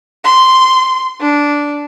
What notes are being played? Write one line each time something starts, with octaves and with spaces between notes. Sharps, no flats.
C6
D4